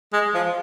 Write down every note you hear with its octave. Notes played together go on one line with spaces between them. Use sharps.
G#3
F3